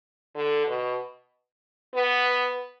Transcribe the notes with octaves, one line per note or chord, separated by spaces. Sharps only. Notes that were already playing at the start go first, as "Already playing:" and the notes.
D3
B2
B3